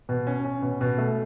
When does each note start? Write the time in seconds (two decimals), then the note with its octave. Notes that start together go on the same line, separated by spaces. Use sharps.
0.09 B2
0.27 C#4
0.45 C#4
0.62 B2
0.81 B2
0.98 A3